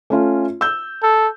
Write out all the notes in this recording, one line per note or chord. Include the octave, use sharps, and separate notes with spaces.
A3 C#4 F4
E6 G6
A4